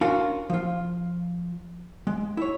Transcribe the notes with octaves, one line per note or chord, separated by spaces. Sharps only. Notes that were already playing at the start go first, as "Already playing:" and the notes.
C#4 D4 F4 F#4 A#4 F5
F3 F4
G#3
E4 C#5